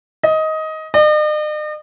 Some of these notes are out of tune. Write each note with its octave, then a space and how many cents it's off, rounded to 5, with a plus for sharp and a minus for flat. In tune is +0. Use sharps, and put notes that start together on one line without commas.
D#5 +15
D#5 -45